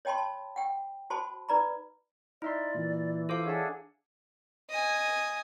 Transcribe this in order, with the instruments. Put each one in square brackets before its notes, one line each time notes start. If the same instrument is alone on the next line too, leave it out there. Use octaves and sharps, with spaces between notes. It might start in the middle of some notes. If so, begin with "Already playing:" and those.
[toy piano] C#5 D#5 G5 A5 B5 C6
A5
F#5 G5
F#4 C5 A5 B5 C6
D#4 B4 D5 A#5 B5
[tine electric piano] D#4 E5 C6 [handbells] E4 [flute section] D5
[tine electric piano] A#2 [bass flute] E3
[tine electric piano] F4 C5 D6 [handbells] A4 F5
[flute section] D4 G#4 F#5 [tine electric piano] C#5 E5 A5
[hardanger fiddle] D#5 G#5